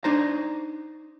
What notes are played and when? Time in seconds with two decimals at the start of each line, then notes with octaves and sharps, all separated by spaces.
0.04 D4 D#4 C5 A#5